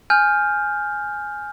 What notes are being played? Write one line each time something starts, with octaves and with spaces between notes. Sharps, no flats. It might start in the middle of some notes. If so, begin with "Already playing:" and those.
G#5 F6 G6